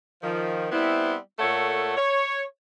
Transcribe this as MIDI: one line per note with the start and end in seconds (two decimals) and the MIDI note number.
0.22 0.68 51
0.22 0.68 53
0.72 1.15 55
0.72 1.15 59
0.72 1.15 60
0.72 1.15 64
1.39 1.95 46
1.39 1.95 57
1.39 1.95 69
1.39 1.95 73
1.39 1.95 78
1.96 2.41 73